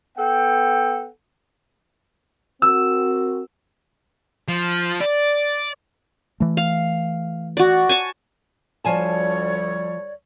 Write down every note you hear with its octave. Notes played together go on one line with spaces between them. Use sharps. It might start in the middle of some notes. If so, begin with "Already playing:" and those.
B3 A4 F#5 G5
C4 F#4 A#4 E6
F3
D5
E3 A3
F5
F#4 D5
G#5 A5 C#6
D2 F3 G3 C#5 D5 G#5 A5